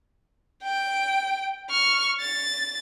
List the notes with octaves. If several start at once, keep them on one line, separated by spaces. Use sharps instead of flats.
G5 D7
C#6 F6
A6